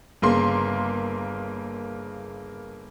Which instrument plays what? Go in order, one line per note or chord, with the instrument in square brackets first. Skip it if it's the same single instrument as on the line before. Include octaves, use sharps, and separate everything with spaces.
[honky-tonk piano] G1 C#3 A#3 C6